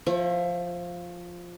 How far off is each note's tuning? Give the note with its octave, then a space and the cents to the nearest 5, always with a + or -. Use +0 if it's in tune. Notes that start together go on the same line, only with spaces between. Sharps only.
F3 +5 C#5 -45 E5 +20